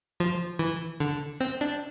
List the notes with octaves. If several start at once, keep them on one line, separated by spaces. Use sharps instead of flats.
F3
E3
D3
C4
D4